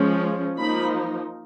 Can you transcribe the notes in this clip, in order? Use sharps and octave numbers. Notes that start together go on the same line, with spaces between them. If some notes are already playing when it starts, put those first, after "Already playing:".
Already playing: F3 G#3 C#4
F3 A#3 D#4 B5